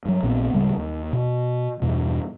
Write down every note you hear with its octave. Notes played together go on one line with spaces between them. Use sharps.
G2 F#3
A#1 A#2 B3 C4
D1 C#3 G3 G#3
D#2
B2
E2 G2 B2